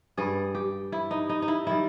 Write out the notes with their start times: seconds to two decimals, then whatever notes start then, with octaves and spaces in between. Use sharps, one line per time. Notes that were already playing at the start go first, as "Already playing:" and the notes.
0.17 G2 G3 G#4
0.55 G4
0.92 E4
1.11 D#4
1.29 D#4
1.42 D#4
1.48 E4
1.67 D#3 G3 E4